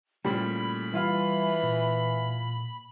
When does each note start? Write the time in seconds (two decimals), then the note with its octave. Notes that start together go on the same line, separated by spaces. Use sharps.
0.25 A#2 C#3 G3 A3 E4 C5 B5
0.94 E3 G3 E4 F4 F5
1.63 A#2